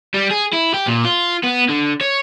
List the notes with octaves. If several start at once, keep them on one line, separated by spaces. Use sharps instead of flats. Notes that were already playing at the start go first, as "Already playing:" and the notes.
G3
G#4
E4
G4
A#2
F4
B3
D3
C#5